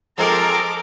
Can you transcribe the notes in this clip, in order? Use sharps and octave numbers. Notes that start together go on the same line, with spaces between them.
F3 G#3 C4 A4 A#4 A#5 D6